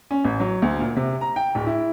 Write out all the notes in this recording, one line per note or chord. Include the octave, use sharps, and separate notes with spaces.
C#4
A1
F#3
D2
A#2
C3
A#5
G5
D1
E4